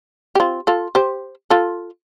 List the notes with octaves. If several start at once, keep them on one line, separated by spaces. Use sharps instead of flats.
G4
C4 F4
F4 A4
G4 C5
F4 A4